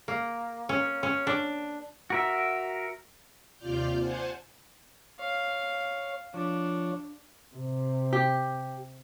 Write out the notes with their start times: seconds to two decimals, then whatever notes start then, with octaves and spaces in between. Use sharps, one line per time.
0.08 A#3
0.69 C#4
1.03 C#4
1.27 D4
2.10 F#4 A#4 E5
3.57 D#2 C3 F4 D5 F6 G6
3.98 C5 F#5 G#5 A5
5.19 C#5 F5
6.34 F3 D4 C#5
7.55 C3
8.13 G4